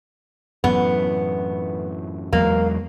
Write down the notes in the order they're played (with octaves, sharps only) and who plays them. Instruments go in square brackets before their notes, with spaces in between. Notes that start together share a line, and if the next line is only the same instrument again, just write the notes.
[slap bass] F#2 A2 E3 [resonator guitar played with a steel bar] B3
[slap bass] E2 F#3 G#3 [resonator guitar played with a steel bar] A#3